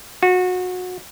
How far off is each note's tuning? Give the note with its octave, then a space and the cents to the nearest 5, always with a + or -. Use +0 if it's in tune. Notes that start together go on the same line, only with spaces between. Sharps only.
F#4 -25